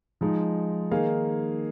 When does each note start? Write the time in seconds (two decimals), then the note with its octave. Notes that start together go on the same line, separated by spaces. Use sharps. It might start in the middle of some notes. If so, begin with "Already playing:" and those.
0.21 F3 G#3 D#4
0.91 D#3 A#3 D#4 G#4 F5